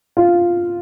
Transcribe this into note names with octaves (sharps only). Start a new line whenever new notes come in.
F4